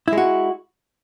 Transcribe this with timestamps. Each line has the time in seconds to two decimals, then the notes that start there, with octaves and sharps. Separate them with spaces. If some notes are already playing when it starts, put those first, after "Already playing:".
0.08 E4
0.13 G#3
0.18 F#4